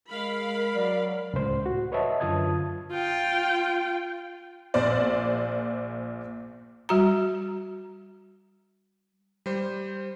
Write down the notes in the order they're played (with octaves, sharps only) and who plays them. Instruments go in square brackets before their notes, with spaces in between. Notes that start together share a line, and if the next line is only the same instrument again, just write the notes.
[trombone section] G#3 [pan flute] A#4 [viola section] F5 B5
[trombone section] F#3 [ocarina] D5
[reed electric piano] C#2 A2 C5
F#4
B4 C#5 D#5 E5 A5
F#2 D3 F4 A5 D#6 G#6
[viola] F4 G5
[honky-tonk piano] A#1 A#2 C5 D5
[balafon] G3 F#4 A#5
[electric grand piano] G3 C5